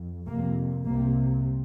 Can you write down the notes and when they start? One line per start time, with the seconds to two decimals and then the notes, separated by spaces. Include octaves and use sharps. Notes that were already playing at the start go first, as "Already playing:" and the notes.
Already playing: F2
0.27 F2 C3 A#3
0.87 C2 C3 A#3